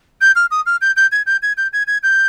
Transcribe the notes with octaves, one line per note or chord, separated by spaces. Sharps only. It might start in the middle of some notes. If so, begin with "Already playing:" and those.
G6
F6
D#6
F6
G6
G6
G#6
G6
G#6
G6
G#6
G#6
G6